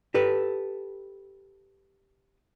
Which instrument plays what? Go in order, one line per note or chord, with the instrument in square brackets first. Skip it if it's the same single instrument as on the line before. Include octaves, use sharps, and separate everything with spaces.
[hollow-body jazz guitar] G4 A4 B4